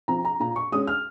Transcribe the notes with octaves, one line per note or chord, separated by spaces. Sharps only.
F3 C4 A#5
A#5
A#2 A#5
C#6
G#3 C#4 D#6
F6